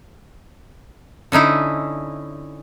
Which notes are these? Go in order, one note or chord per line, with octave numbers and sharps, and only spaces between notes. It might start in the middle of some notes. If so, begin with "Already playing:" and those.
D3 C#4 D#4 E4